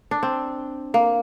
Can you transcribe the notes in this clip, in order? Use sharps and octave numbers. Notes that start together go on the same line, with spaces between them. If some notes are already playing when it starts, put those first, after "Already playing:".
D4
C4
A#3